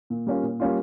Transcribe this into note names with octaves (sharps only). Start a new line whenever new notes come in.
A#2
G3 A#3 C#4 F4
A#2
G3 A#3 C#4 F4